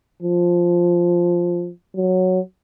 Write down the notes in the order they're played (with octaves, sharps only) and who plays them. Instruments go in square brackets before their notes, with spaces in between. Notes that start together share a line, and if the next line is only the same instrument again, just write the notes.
[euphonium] F3
F#3